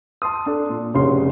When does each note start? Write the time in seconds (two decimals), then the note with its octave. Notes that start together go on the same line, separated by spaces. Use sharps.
0.22 A5 C6 D#6
0.46 D4 A4
0.69 A#2
0.94 F1 C#3 D4 F#4 C#5 C6